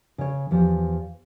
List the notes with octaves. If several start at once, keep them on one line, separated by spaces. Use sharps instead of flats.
C#3 C#5
E2 F3 G4